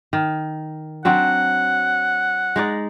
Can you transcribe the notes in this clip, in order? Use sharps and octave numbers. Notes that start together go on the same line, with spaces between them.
D#3
F#3 C4 D4 F#5
G#3 D#4 D5